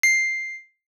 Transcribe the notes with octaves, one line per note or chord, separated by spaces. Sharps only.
C7